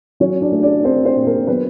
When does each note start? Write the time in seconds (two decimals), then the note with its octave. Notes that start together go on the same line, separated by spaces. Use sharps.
0.20 F#3 C#4 C#5
0.41 D4 D5
0.52 A3
0.63 D4 D5
0.84 C4 D4 C5
1.05 C4 C5
1.16 A#2
1.26 A#3 A#4
1.47 F#3 B3 B4